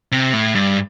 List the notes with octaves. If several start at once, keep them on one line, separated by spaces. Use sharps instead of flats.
C3
A2
G2